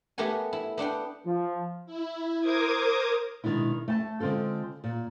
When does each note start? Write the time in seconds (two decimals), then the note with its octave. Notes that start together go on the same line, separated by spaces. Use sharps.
0.18 A3 B3 G4 A#4 F#5 G#5
0.53 E4
0.77 B3 D4 F#5 G5
1.26 F3
1.86 E4
2.39 A#4 C5 D6 D#6 G#6
3.44 B2 D#3 G#3 D4 E4
3.88 A3 A5
4.20 D3 G#3 C4 F4 A4
4.84 A#2